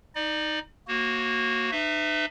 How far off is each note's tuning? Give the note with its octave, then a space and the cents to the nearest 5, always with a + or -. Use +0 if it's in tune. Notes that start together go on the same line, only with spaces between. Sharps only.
D#4 +5 D5 +35
A#3 +0 F#4 +0 C#5 -35
D#4 -40 B4 +45 E5 +0